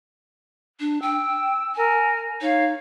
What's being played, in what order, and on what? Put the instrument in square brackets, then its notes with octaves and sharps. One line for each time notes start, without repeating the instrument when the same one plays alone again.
[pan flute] D4
[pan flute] G5 [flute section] E6
[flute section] A#4 [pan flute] G#5
[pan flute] D#4 [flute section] C#5 F5